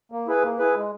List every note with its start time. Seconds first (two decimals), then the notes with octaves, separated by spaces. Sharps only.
0.12 A#3
0.28 E4 G#4 B4
0.43 A#3
0.59 E4 G#4 B4
0.75 G#3